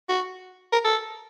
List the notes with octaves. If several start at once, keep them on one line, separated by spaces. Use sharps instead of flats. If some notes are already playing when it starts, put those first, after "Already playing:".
F#4
A#4
A4